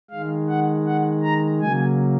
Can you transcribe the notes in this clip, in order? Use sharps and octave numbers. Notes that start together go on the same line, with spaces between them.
D#3 G#3 F5
F#5
F#5
A#5
C#3 F#3 A#3 G#5